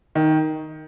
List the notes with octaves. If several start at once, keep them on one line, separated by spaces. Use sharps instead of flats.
D#3